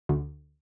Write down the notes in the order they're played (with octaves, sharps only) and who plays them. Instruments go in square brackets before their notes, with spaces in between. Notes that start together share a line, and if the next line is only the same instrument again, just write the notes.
[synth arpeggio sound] D2